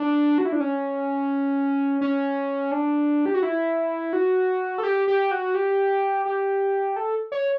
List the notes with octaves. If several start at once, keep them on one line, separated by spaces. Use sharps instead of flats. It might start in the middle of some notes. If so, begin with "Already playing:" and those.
Already playing: D4
F#4
E4
D4
C#4
C#4
D4
G4
F#4
E4
F#4
A4
G4
G4
F#4
G4
G4
A4
C#5